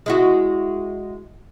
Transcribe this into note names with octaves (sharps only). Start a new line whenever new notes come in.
G#3 E4 F#4